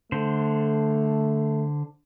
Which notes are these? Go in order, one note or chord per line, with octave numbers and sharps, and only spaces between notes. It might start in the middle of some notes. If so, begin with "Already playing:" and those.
D3 A3 C5